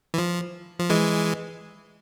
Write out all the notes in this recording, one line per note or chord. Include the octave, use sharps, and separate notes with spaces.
E3
F3
F3
E3 G#3